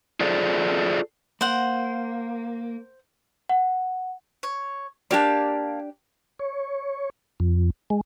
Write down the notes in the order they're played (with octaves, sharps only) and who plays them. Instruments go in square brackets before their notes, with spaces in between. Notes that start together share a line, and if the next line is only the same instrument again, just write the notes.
[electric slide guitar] F4 G#4 A4 C5 D5
[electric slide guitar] A#3 [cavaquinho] C5 F#5
[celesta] F#5
[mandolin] C#5
[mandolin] A#3 F5 A5 [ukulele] D4 G4 D5
[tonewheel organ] C#5
F2
G#3